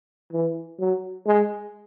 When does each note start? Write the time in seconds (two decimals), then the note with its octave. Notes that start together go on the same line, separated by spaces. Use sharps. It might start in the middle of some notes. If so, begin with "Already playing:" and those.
0.32 E3
0.79 F#3
1.26 G#3